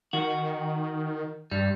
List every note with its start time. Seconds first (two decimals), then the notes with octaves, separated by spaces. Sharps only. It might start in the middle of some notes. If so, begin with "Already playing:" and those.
0.13 D#3 F#4
1.51 G2 G3